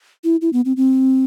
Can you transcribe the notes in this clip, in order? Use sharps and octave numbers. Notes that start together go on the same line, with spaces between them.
E4
E4
B3
C4
C4